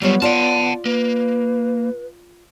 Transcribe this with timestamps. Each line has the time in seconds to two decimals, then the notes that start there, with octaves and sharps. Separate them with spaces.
0.02 F#3 G3 B3 F4 C#5
0.22 F4 D5 F#5 A5
0.85 A#3 B4